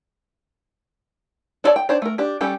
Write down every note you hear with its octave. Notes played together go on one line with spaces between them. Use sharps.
D4 A4 C#5 D5 A5
G5
D4 C5 C#5
A3 A#4
D4 G4
G3 C#4 G4 A4